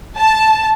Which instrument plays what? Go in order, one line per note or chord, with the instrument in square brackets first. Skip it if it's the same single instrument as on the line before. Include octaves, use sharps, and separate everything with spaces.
[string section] A5